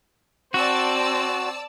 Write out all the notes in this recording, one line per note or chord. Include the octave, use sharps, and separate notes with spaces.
C4 F#4 D5 A5 E6